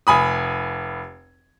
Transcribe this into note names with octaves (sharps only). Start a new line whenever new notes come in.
F1 G#5 B5 D#6